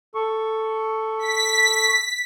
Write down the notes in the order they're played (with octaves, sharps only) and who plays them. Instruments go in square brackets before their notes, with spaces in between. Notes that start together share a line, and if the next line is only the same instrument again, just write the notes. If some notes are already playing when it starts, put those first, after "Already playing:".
[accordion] A4 C#6
[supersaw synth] B6